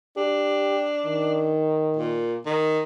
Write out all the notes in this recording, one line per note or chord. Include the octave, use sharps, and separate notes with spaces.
D4 G4
D#3
A#2
D#3